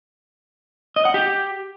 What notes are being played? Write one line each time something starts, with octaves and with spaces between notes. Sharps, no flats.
D#5
F#5
G4